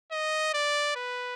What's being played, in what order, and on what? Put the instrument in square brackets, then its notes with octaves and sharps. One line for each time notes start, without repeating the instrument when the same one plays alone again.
[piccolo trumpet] D#5
D5
B4